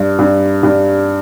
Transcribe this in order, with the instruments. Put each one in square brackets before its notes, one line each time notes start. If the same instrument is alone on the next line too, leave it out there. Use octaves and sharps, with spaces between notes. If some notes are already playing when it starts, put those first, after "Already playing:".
Already playing: [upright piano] G2
G2
G2